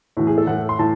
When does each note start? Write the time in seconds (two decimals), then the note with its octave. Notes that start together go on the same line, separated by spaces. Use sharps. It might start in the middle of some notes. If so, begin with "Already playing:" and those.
0.17 A2 E3 F#4
0.27 G#4
0.38 A4
0.47 A2 E3 F#5
0.69 C6
0.79 A2 E3 A5